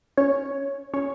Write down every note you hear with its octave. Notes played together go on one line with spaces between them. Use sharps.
C#4 C#5
C#4 C#5